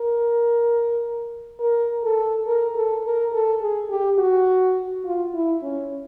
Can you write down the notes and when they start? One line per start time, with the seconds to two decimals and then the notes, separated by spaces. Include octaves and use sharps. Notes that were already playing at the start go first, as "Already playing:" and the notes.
Already playing: A#4
1.60 A#4
2.04 A4
2.47 A#4
2.76 A4
3.04 A#4
3.33 A4
3.61 G#4
3.90 G4
4.19 F#4
5.05 F4
5.34 E4
5.63 C#4